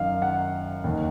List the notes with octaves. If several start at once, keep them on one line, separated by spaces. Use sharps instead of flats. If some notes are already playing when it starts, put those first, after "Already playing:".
Already playing: F#2 D#3 F5
F#5
D#2 D#3